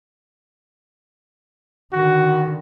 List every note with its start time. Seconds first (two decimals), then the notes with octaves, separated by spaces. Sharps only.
1.93 D3 D#3 F#4